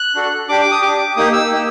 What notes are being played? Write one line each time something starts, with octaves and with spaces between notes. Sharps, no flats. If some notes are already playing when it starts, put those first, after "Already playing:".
Already playing: F#6
D4 F#4 A4
D4 G4 D6
D6
D#6
G4 D6
D4
A#3 D#4 G4 D#6
E6
A#3 D#4 G4